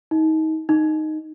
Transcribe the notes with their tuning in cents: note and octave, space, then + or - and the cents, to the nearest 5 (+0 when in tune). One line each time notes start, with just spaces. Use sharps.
D#4 +30
D#4 -5